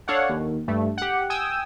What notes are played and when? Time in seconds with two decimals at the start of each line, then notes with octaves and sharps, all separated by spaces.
0.08 D4 A4 C#5 F5 F#5
0.29 D#2
0.68 G2 A3
0.98 G4 F#5
1.30 G5 G#5 D#6 E6